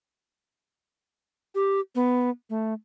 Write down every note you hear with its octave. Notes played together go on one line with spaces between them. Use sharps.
G4
B3
A3